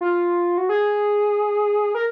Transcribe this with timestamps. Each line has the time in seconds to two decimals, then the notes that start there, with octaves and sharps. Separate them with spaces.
0.01 F4
0.58 F#4
0.69 G#4
1.95 A#4